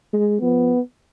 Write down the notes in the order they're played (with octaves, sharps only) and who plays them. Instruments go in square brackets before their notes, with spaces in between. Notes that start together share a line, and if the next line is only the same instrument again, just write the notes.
[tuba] G#3
[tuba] F3 [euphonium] B3